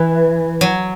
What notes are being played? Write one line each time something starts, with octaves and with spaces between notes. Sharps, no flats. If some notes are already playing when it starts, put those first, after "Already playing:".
Already playing: E3
F#3